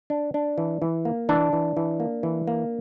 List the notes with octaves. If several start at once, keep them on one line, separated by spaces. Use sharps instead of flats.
D4
D4
E3
E3
A#3
E3 D4
E3
E3
A#3
E3
A#3